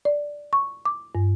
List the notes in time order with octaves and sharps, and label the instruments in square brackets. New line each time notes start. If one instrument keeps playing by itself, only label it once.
[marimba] D5
C#6
D6
G2